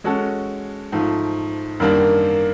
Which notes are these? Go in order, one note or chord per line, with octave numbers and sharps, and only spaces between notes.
G#3 C#4 F#4 A4
G#2 F3 A3
F#2 D#3 G3 A#3 D4